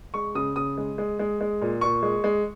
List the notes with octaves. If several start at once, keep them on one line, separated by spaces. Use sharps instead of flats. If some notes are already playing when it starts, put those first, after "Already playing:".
G#3 C#6
C#3 D#6
C#3 D#6
G#3
G#3
G#3
G#3
A#2
A#2 C#6
G#3
G#3